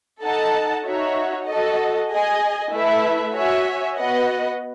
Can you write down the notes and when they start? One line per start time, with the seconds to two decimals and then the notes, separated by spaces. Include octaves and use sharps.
0.23 D#4 A4 D#5 F#5 A5
0.85 D#4 F#4 C#5 E5
1.46 F#4 A4 D#5
2.09 G#4 D#5 G#5
2.71 A3 E4 B4 E5
3.33 F#4 C#5 E5 G#5
3.96 B3 F#4 B4 D#5 F#5